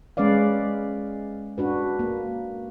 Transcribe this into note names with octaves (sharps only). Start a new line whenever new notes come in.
G#3 C#4 B4 D5 F5
D4 F#4 B4
A#3